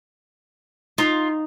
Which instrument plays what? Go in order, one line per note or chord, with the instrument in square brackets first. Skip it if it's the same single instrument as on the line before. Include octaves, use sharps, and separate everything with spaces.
[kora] D#4 [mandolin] F4